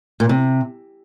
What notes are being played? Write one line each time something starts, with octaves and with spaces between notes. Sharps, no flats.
A#2
C3